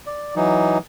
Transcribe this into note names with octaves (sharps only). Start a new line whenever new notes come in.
D5
E3 F#3 D#4